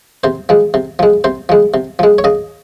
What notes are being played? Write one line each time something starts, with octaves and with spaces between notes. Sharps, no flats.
C3 C5
F3 G#3
C3
F3 G#3
C3 C5
F3 G#3
C3
F3 G#3
C#5
C#3 D#5